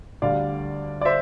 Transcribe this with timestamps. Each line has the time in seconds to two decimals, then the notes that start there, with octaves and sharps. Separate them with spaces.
0.22 D2 D3 G3 D5 F5
1.01 D5
1.05 C5 E5